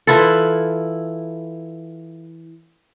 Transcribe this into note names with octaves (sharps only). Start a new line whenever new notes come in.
E3 E4 F4 A4